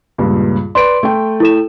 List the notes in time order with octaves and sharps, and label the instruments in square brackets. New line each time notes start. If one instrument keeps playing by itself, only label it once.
[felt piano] C#2 G2 A#2
[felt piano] B4 D5 [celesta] C6 D7
[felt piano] A3 G5
[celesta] E4 A4 E7